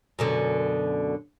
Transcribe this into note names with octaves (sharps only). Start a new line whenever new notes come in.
F#2 B2 D3